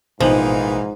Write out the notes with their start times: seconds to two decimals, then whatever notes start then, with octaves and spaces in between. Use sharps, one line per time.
0.20 A1 G#2 B2 E3 F3 A#3 D#4